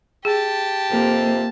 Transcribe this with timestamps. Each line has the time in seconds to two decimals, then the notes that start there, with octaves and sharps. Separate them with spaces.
0.25 G4 G#4 A5
0.91 F2 C3 A#3